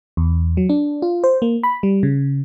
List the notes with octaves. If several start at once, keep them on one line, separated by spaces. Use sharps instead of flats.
E2
F#3
D4
F4
C5
A#3
B5
G3
C#3